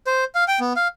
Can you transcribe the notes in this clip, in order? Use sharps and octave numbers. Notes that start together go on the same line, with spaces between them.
C5
F5
G5
B3
F5